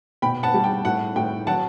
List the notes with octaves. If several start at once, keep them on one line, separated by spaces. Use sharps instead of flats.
B2 G5 B5
F#5 A5
G3
G5
A2 F#5
A2 G5
F#3 F#5 A5